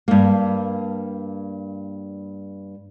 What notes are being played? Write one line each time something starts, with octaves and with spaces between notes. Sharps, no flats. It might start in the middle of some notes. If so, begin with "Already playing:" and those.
G2 A#3